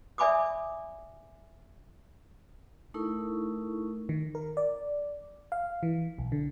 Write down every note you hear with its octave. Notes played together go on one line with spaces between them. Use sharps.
D5 E5 G#5 B5 D6 D#6
A3 D#4 E4 A4 A#4 C#6
D#3
A#4
D5
F5
E3
B1
D3